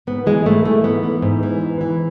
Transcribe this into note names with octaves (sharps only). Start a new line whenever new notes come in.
G#2 B3
E3 G#3
G#2 A3
E3 A3
G#2 B3
E3
G#2
E3
G#2
E3